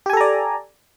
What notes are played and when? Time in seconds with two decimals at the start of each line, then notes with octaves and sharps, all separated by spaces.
0.06 G4
0.10 G#5
0.13 A4
0.17 A#5
0.21 D5